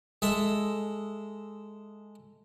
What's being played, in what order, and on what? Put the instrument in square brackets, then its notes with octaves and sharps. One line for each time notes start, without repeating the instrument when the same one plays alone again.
[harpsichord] G#3 G#4 A4 E5